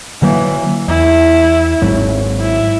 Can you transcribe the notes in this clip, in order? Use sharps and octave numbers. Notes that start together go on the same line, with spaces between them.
D3 E3 F#3 A#3
E2 E4
G#1 G#2 F#3
E4